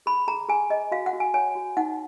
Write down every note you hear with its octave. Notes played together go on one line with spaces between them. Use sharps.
G#4 B5
G#4 A#5
G#4 G#5
G#4 D#5
F#4 F5
F#5
F#4
G#5
C#5 G#5
F#4
D#4 F#5